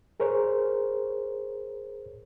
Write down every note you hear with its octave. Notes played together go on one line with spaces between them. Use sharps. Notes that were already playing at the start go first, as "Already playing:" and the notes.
G#4 A#4 C5 C#5